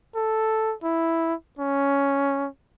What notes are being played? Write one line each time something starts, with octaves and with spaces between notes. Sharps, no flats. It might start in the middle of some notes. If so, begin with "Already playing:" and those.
A4
E4
C#4